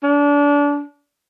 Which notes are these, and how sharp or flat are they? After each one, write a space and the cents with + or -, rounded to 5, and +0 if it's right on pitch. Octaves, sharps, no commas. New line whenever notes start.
D4 -30